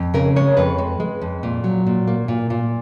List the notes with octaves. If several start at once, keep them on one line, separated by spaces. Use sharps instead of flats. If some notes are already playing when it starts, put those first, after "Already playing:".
Already playing: F2
C#3 A#4
G#3 C#5
F2 B4
G#3
G#3
F2
A#2
F#3
A#2
A#3
A#2
A#2